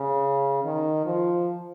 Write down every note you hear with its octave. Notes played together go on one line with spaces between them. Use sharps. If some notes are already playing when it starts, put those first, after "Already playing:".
Already playing: C#3
D#3
F3